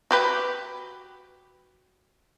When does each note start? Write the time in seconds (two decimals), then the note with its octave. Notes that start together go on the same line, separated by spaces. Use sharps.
0.11 F#4 G4 B4